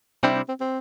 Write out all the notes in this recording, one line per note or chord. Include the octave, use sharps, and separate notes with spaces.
C3 G3 C4 D4 E4
D4
C4
C4